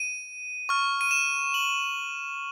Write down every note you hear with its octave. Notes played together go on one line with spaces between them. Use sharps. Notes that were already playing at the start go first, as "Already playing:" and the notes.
Already playing: D#7
C#6 F6
D#7
E7
F#7